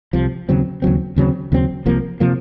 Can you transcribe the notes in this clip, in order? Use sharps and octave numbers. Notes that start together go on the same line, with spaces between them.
C2 C3 F3
D#2 C#3 F#3 C4
D#2 C#3 F#3 C4
D#2 C#3 F#3 C4
D#2 C#3 F#3 C4
C2 C3 F3 A#3
C3 F3 A#3